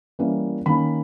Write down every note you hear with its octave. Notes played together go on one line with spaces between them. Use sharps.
E3 G3 A#3 C#4
D#3 A#3 C#4 B5